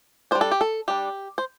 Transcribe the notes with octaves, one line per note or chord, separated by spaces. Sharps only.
G3 D4 C5
A4
G4
A4
G3 D4 G4
C5